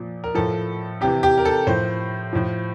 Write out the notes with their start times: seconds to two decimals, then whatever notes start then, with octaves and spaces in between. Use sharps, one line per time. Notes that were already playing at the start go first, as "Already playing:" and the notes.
Already playing: A#2 F3
0.24 A#4
0.35 A2 F3 A4
1.01 C3 E3 G4
1.23 G4
1.38 A#4
1.45 A4
1.67 A2 F3 C5
2.33 A2 F3